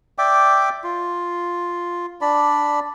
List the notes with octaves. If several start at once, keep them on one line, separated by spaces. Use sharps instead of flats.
D5 E5 G5 D6
F4
D4 D5 B5